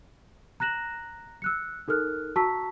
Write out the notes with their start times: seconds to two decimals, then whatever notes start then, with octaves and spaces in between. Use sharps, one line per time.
0.60 A#5 F#6 A#6 E7 F#7
1.42 E6 F#6 C#7
1.88 D#4 A4 A#4 F6 F#6
2.36 F#4 A5 A#5 C#6 E6 B6